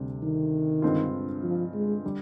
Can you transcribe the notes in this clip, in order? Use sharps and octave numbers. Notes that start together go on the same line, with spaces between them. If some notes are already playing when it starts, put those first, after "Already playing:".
Already playing: D2 C3 G3 C4
D#3
G2 D3 G#3 C4 F4
F3
G#3
D3 G3